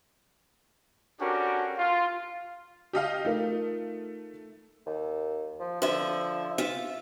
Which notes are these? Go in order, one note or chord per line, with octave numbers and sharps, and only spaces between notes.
C#4 D4 F#4 G4 A4 A#4
F4
G4 D#5 F5
A3 D#4 F4 A#4
D#2
F3
D3 F3 E5
F4 E5